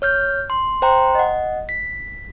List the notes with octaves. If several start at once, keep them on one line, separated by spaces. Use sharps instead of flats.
C#5 F6 G6
C6
C5 G5 A#5 C6
D#5 F#5
B6